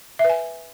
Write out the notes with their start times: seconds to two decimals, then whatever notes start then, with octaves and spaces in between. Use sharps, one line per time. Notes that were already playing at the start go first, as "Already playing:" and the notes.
0.19 E5
0.24 B4
0.30 G#5